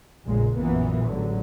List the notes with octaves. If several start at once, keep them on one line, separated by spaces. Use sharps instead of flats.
F1 A#1 A#2 C#3 G#3
A#1 F#2 E3 A#3 B3
A1 G#2 D3 F#3